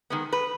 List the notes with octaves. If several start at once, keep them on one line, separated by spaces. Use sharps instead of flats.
D#3 G#3 B3
B4